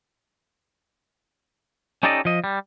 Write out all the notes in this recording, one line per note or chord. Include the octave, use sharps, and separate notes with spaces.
C#4 D#4 G4 A4 D5 D#5
F3 D#5
G3